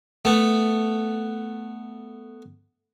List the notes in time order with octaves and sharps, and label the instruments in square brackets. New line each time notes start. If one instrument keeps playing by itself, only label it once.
[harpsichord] A3 B3